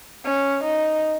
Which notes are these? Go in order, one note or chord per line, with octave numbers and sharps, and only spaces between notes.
C#4
D#4